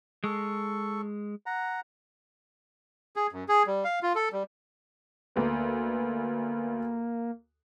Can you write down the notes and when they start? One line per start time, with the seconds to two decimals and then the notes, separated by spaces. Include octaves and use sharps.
0.24 G#3 A4 C#6
1.46 F#5 A#5
3.16 G#4
3.33 F#2
3.49 G#4
3.67 G3
3.84 F5
4.03 F4
4.15 A4
4.33 G3
5.36 D2 A#3 B3